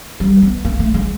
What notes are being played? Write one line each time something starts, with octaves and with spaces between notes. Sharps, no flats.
G3
B3
A#3
A3
G#3